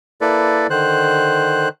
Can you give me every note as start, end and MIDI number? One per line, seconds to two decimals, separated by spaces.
0.21 0.67 58
0.21 0.67 64
0.21 0.67 69
0.21 0.67 71
0.21 0.67 74
0.70 1.69 50
0.70 1.69 51
0.70 1.69 72
0.70 1.69 90